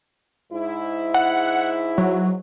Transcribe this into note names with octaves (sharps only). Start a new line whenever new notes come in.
G#2 E4
F#5
F#3